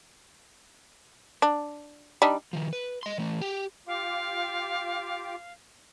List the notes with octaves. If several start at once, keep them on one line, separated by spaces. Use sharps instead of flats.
D4
G3 D4 D#4
D#3 F3
B4
D#5 C6
E3 A3
G4 G5
F4 G4 F5 D6